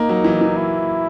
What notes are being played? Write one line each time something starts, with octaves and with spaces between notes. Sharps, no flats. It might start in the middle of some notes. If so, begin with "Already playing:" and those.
Already playing: A#3 D#4
F#3
E3
E3
E4